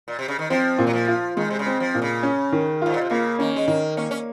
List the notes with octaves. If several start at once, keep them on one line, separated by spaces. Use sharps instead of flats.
A#2
C3
C#3
D#3
F3 C4
A#2
F#3
F3
F4
D#3 G#3
C3
C#3
C4
F3
A#2
C#3
C#4
D#3
G#2 F4
A#2
C3
C#3 A#3
D#3 C#4
G#3
D#3 A#3
A#3 C#4
C#4